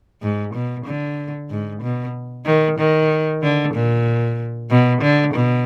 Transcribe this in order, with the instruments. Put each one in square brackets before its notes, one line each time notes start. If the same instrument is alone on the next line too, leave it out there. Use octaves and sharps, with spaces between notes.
[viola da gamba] G#2
B2
D3
G#2
B2
D#3
D#3
D3
A#2
B2
D3
B2